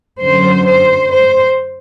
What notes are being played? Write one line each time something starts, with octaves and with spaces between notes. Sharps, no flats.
F#2 D3 F#3 C5
C5
C5